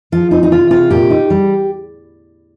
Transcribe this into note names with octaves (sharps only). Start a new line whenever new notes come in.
F3 F4
C4 D#4
D#4
C3 F4
C3 F4
A#2 G4
D#4
G3